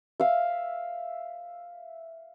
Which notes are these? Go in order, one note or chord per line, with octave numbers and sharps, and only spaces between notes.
E5 F5